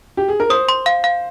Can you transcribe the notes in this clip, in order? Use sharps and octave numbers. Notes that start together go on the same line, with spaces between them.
G4
G#4
A#4
C5 D#6
C6
F5
F5